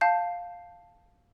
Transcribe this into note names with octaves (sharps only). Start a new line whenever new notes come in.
F5 A5 G6